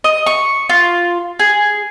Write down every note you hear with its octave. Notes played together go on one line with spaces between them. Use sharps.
D#5
C#6
F4
G#4